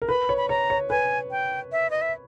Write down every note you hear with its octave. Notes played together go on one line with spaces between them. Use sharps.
A#4
B4 B5
C#5
B5
C#5 A#5
C#5
B4 G#5
G5
E5
D#5
E5